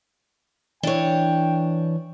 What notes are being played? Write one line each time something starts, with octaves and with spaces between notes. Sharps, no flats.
E3 D4 C#5 G5